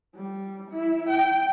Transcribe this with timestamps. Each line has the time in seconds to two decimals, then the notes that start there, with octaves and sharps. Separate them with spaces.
0.15 G3
0.71 E4
1.09 G5